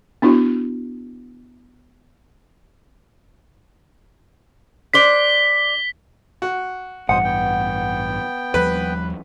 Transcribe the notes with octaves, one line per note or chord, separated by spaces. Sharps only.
B3 D4 E4 F#4
D4 C5 D5 B6 G7
F#4
A1 G2 B2 C5 F#5 D#6
B3 G5
D#2 F3 G3 B4